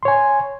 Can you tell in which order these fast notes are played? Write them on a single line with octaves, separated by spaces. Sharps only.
C6 C#5 G#5